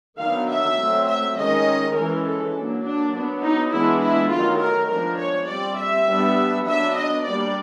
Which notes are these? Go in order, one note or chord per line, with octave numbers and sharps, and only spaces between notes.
D#3 F#3 B3 D4 F5
E5
F#3 A3 C4
E5
D#3 G#3 C#4 D#5
E3 G#3 C#4 A#4
A4
F#3 A#3 D4
D4
F#3 B3 D4
D#4
E3 G#3 B3 D4 E4
E4
D#3 F#3 A3 F4
A#4
F3 G#3 B3 D4 A#4
C#5
G3 C4 D5
E5
G3 B3 D4
F#3 B3 D4 E5
D#5
G3 A#3 D4 D5